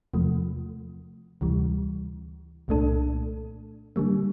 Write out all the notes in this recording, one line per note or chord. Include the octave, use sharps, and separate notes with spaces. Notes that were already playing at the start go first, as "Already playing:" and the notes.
E2 C3 F3 A3
D2 C3 E3 G3
C2 A#2 A3 D4 A4
D3 G3 A#3